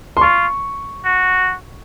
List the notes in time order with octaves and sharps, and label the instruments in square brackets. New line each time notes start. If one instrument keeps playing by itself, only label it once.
[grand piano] C6
[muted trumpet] F4 [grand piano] C#6
[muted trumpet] F#4